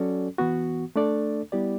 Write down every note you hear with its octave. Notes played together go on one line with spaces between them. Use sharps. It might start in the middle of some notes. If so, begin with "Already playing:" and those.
Already playing: F#3 C#4 F#4 A4 D5
E3 B3 F#4
A3 D4 A4 D5
G3 B3 E4 G4 D5